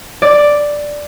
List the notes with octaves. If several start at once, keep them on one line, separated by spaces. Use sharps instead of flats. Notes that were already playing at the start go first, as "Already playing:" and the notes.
D5